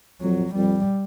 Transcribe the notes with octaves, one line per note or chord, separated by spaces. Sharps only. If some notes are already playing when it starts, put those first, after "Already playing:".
F2 F#3
F2 G3